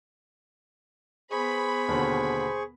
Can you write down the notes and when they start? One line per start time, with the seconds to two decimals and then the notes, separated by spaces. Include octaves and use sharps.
1.31 B3 G#4 C5 B5 C#6
1.88 D#2 B2 D3 C5